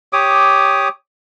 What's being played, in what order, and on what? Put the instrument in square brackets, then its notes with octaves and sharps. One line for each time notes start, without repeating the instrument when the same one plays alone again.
[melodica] G4 C#5 D6 D#6